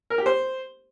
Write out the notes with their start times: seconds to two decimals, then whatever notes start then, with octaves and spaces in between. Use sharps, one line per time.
0.10 A#4
0.18 G4
0.26 C5